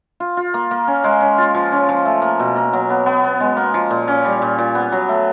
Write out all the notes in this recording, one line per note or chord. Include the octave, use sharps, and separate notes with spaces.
F4
F4
A#3
A#3
C#4
G#3
C#4
F4
F3
C#4
F3
A3
A#3
B2
A#3
F#3
B3
B3
B3
G#3
A#3
F3
A#2
C#4
G3
A#2
A#2
B3
F#3
A3